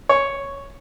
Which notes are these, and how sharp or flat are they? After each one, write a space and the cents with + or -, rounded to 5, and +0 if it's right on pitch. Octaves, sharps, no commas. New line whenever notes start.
C#5 +0